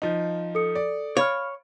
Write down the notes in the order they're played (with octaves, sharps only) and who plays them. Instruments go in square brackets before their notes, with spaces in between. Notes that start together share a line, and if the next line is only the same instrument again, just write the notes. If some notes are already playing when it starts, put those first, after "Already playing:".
[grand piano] F3 D#4
[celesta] A4 D#6 C#7
[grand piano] D5
[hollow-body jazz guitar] C#5 [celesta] F5 B5 F6